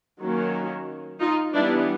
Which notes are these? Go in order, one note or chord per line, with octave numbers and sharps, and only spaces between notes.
D#3 F#3 A#3 C#4
D#4 F4
E3 G3 B3 D4 E4